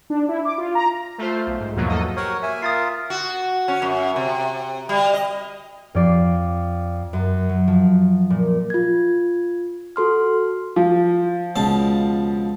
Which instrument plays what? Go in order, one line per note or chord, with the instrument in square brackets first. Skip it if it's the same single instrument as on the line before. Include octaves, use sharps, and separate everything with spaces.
[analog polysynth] D4
E4
D6
F4
A#5
A3 F4 C5
B1
G#2
E2 G#2 B2 F3 F#3 A#3
A#3 A4 D#5
[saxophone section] F#4 G4 C5 [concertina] A#4 C#5
[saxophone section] A#3 E5 [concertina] G#5
[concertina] F4 A#4 [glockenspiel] D#6 A6 C7
[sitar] F#4
C#4
F#2
C3
G3
D#5
[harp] F2 D5 C7
F#2
F#3
F3
A#2
[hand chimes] F4 G#6
F#4 A4 C6 F6
[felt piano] F3
[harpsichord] C#2 B2 A5